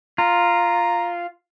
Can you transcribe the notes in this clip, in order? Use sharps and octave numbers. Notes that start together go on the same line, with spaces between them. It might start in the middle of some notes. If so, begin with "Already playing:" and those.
F4 A#5